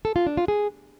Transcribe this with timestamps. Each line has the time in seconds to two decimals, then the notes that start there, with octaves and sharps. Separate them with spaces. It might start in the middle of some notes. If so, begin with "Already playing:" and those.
0.05 A4
0.16 F4
0.27 D4
0.37 F4
0.48 G#4